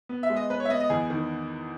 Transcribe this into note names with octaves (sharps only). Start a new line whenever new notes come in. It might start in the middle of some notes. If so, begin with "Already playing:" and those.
B3
E5
G#3
D#5
B3 B4
C#5
E5
B3 D#5
D#5
E2 G#4
D#3